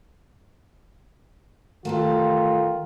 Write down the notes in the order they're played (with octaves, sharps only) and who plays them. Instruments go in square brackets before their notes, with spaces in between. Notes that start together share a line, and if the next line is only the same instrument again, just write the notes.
[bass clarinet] D#3 [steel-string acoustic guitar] E3 G3 A3 [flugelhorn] F4